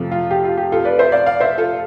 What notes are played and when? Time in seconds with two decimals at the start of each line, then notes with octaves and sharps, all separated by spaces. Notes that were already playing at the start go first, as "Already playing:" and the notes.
Already playing: F2 C3 F3 A3
0.11 F4
0.31 G4
0.45 F4
0.57 G4
0.72 F4 A4
0.85 B4 D5
0.99 C5 E5
1.12 D5 F5
1.26 D5 F5
1.40 C5 E5
1.58 F4 A4